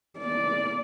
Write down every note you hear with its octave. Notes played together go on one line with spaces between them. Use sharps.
D5